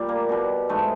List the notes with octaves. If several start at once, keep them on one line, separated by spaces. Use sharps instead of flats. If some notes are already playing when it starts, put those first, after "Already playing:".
Already playing: A#2 G3
A#3
B2 G3
G#2 E3 G#3 A3